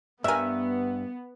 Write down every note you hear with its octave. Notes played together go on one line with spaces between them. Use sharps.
G2 B3 A#4 E5 G#5